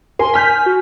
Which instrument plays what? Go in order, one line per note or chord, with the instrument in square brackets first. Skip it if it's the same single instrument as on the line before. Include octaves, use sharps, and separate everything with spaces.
[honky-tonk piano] A#4 G#5 [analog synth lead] C6
[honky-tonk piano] G#5 F6 G6 [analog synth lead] B6
[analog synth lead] F#4